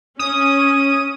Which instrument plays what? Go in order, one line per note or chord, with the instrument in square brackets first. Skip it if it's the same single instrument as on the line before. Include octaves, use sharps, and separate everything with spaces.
[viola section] C#4 [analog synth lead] D#6